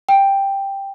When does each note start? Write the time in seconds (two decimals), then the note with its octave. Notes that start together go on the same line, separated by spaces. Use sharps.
0.09 G5